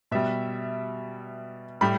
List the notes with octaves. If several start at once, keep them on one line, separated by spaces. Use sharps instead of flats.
B2 G3 E5
A2 G3 B5